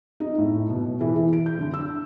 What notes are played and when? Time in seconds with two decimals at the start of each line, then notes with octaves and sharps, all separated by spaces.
0.20 D#4
0.38 A2
0.70 B2
1.01 E3
1.16 E3
1.33 D7
1.46 G6
1.59 D3
1.74 E6